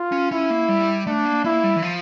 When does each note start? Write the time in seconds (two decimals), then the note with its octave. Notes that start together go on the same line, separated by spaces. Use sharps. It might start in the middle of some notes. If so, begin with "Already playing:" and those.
Already playing: F4
0.12 C#4
0.31 C#4 E4
0.50 A#3
0.69 G3
1.07 A3 D4
1.25 A#3
1.44 A#3 E4
1.63 G3
1.76 E3
1.82 F3